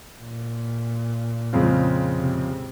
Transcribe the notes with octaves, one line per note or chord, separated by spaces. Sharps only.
A#2
F2 C#3 G#3 C4 F4
C3